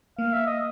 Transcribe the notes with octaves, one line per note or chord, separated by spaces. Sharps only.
A#3 F5
E5
D#5